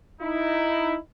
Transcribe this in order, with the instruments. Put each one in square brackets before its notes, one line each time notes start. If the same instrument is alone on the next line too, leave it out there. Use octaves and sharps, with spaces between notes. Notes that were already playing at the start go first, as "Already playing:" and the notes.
[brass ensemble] D#4 E4